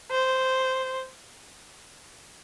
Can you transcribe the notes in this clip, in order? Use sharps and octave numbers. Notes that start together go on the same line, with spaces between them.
C5